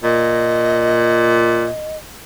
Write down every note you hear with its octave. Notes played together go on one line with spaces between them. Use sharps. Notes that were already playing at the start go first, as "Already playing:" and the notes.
A#2 D#5